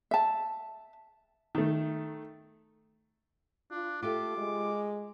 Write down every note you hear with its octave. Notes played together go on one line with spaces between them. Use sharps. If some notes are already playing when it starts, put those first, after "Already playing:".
E5 A5
D#3 A3
D4 F4
A3 F4 G4 A4 D6
G#3